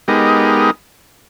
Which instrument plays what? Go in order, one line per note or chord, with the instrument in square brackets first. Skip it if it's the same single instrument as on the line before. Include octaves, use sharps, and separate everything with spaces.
[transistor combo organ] G#3 B3 D#4 G4 A#4